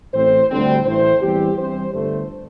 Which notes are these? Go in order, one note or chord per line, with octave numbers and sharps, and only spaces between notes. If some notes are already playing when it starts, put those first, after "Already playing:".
A1 A2 E3 C4 C5
D2 D3 G3 C4
A1 A2 E3 A3 C5
E2 E3 G3 C4 G4
G2 E3 C4 C5
G1 G2 D3 A3 C5